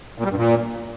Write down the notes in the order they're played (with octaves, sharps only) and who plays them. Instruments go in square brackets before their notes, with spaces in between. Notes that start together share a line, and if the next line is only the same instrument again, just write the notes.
[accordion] A#2
G3
G2
A#2